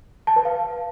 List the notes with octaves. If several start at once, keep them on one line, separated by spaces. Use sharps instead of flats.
A5
B4
F5